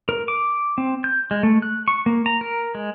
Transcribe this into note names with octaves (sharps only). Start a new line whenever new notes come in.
A#4
D6
C4
G6
G#3
A3
F#6
C#6
A#3
A#5
A#4
G#3